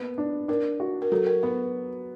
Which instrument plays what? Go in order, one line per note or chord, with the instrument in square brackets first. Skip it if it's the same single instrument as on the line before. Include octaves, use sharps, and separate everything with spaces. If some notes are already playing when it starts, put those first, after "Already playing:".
Already playing: [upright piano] A#3 B3
D4
[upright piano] D4 [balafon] A#4
[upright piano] F#4
[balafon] A#4
[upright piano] F#3 [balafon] A4
[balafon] A#4
[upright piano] B3 [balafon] B4